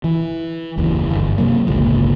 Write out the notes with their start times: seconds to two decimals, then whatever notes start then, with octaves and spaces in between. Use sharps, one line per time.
0.04 E3
0.78 F#1 D#2 E3
1.11 G1
1.38 C3 F#3 A#3
1.67 G1 C#2 A#2